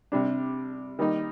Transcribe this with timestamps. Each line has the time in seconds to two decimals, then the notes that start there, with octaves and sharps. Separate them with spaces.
0.12 C3 G3 D4
0.99 D#3 G3 A#3 D#4